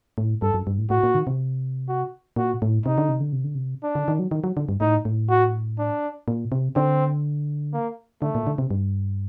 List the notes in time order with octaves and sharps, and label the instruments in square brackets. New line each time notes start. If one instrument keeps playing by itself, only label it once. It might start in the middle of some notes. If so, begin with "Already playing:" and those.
[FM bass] A2
[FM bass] G2 [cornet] A4
[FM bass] F#2
G2
A2
[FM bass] A2 [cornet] F#4
[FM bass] A#2
D#3
C3
[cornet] F#4
[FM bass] A#2 [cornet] F#4
[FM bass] A2
[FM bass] C3 [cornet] D#4
[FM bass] D3
C3
D3
C3
D3
C3
[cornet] D4
[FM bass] D3
D#3
F#3
D#3
F#3
D3
G2
[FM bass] A2 [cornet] D#4
[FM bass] A2
[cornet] F#4
D4
[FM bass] A#2
C3
[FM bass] D3 [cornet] C4
[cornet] A#3
[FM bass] D3 [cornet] A3
[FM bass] A#2
D3
C3
G2